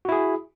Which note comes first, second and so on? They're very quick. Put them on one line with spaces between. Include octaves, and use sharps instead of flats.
F#4 E4 G#4